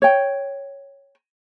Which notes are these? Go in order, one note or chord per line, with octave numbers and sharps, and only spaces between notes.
C#5 G5